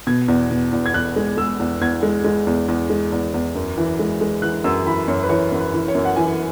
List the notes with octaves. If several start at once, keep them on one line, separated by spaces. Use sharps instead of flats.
B2 G#6
E2
B2
E2
G#6
E2 F#6
G#3
G#3 E6
E2
E2 G#6
G#3
G#3
E2
E2
G#3
E2
E2
F#2
E3
G#3
G#3
E3 F#6
F#2 E6
E3 B5
F#2 C#5
B4
E3 C#5
F#2
B4
E3
C#5
F#2
F#5
E3 G#5